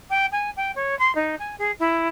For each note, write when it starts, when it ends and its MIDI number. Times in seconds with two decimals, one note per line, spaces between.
0.10 0.26 79
0.32 0.50 80
0.56 0.72 79
0.76 0.97 73
0.99 1.14 84
1.15 1.35 63
1.39 1.58 80
1.58 1.72 68
1.79 2.08 64